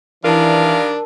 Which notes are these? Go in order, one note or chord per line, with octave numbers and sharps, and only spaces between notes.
D#3 E3 G3 D4 A#4 F5 A5